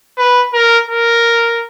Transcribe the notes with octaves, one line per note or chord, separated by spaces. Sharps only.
B4
A#4
A#4